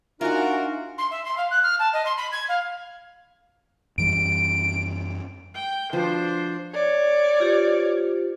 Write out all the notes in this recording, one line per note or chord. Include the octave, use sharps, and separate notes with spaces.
D4 D#4 F4 F#4 A#4 D5 E5 G#5
C6
E5
C6
F5
F#6
F6
A5
D#5
C6
B5
G#6
F5
F#2 E3 G3 D7
G5
F3 D4 F#4 B4 C5
C#5 D5
F4 G4 C5